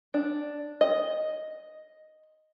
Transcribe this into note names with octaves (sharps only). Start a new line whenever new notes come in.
D4
D#5